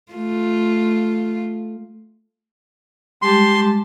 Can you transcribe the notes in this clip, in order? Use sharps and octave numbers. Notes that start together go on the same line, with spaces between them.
A3 F4
G3 G#3 G4 A5 C6